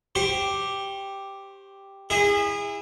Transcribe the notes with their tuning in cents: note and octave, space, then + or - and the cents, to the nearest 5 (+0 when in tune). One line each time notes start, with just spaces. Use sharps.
G4 +0 C5 +0 C#6 -35
E4 +0 G#4 -30 E5 +0